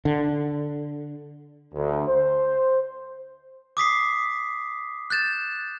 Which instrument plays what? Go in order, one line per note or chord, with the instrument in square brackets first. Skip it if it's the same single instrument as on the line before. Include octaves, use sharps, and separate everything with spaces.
[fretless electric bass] D3
[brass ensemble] D2
C5
[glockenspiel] D6 D#6 B6 C7
F#6 G6 A6 E7